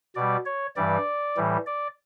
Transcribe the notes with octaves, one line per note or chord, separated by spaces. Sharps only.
B2 G3 D5
C#5
G2 E3 G3 D5
A2 E3 G3
D5